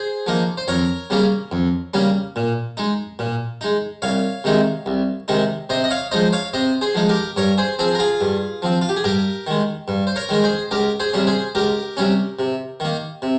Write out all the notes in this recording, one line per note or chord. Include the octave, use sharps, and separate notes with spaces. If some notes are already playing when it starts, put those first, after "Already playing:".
Already playing: G#4 C5
F3 A#3 D#4
C5
F2 A#4 C#5
C#3 G3 A#3 C#4
F2
C#3 G3 A#3 C#4
A#2
G#3 D#4
A#2
G#3 D#4
C2 C#5 F5
C3 D#3 G#3 D#4
C2
C3 D#3 G#3 D#4
C3 C5 D#5
D#5
C#5 F5
F3 G#3 D#4 C5 D#5
C#5 F5
C3 C5 D#5
G#4 C5
F3 G#3 D#4
G4 A#4
G2 A#4 C#5
G#4 C5
F3 C4 G#4 C5
A#4
F4 G#4
G2
F3 C4
F4
G4
G#4
G2 G4 A#4
D#3 G#3
G2
C5
A#4 C#5
D#3 G#3 A#4
G#4 C5
C#2 G4 A#4
G#4 C5
C3 G3 C#4
G#4 C5
C#2 G4 A#4
C3 G3 C#4
C3
D#3 A#3
C3